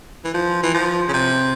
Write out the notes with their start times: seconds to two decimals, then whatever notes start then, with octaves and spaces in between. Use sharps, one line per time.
0.24 E3
0.34 F3
0.63 E3
0.74 F3
1.08 C#3
1.14 C3